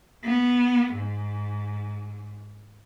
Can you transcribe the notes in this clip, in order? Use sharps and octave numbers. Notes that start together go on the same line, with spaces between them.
B3
G#2